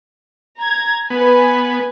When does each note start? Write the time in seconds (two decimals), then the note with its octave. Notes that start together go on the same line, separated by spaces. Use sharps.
0.58 A#5 G#6
1.10 B3 B4 G#5